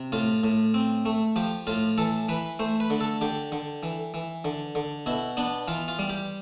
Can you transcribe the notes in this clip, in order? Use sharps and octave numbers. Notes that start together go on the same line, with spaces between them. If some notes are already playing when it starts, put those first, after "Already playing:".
Already playing: C3
A2 F4
A2
C4
A3
F3 G4
A2 F4
E3 A4
E3 B4
A3 C5
B4
D3
A4
D3 G4
D3
E3
E3
D3
D3
B2 E4
B3 D4
E3 F4
F4
G3
G4